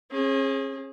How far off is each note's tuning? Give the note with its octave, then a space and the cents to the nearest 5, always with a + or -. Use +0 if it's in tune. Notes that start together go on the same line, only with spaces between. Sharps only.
C#4 -40 G#4 +0